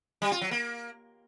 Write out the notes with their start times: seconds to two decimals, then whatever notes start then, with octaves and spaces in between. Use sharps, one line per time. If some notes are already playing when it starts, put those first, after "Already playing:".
0.22 G3
0.32 F4
0.41 F#3
0.51 A#3